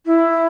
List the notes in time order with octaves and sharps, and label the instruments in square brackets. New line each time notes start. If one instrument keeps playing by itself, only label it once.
[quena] E4